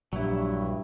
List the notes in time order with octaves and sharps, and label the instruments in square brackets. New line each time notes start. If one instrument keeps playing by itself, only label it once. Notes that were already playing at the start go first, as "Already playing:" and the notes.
[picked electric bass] A#1 [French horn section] G2 [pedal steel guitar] F#3 E4